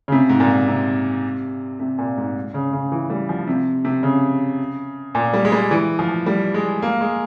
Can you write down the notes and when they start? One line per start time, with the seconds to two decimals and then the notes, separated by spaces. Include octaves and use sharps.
0.08 C#3
0.12 C3
0.29 G#2
0.40 A#2
0.68 C3
1.80 C3
1.98 A#2
2.17 G#2
2.54 C#3
2.73 C#3
2.92 E3
3.10 G3
3.29 F3
3.47 C3
3.85 C3
4.03 C#3
5.15 A#2
5.33 G3
5.45 G#3
5.52 G3
5.71 E3
5.99 F3
6.26 G3
6.54 G#3
6.82 A#3
7.01 G#3